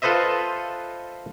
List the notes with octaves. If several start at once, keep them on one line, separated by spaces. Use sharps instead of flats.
F4 A4 B4 C5 D#5 E5